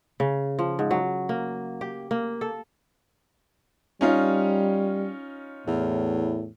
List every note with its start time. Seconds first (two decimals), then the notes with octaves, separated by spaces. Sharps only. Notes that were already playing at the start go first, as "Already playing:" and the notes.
0.20 C#3
0.59 F3
0.79 G#2
0.91 F#3
1.29 A#3
1.81 G4
2.11 A#3
2.41 A4
4.01 G3 C#4 D#4 F4
5.67 E2 A2